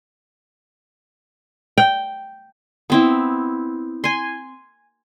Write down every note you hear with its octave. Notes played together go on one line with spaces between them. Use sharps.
G5
B3 C4 E4
G#5 C6